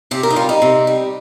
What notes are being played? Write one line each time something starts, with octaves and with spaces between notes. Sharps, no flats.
C3 G4
A#4
D#4
G3 F4
D#4
C3
G3